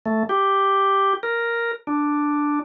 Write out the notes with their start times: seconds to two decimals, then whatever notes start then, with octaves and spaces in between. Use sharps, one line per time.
0.06 A3
0.29 G4
1.23 A#4
1.87 D4